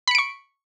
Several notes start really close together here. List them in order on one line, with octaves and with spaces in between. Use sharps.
B5 C#7 D7 C#6